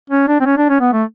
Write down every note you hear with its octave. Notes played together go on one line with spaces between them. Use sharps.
C#4
D4
C4
C#4
D4
C#4
B3
A3